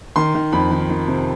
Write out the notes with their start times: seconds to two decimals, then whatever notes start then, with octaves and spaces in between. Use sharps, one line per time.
0.16 D#3 C6
0.35 D#3
0.53 F2 B5
0.71 D#3
0.90 D#3
1.08 C3